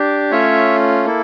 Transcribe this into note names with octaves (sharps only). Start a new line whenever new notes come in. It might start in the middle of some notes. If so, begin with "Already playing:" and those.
Already playing: D4 G4
A3 C#4 F4 C#5 E5
A#3 E4 A4